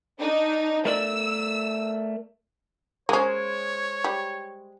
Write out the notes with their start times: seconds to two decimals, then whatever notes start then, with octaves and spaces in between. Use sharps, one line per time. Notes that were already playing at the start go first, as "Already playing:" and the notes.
0.19 D4 D#4
0.85 A3 A#4 D5 E6
3.09 G#3 A#3 C#4 C5 C#5
4.04 G3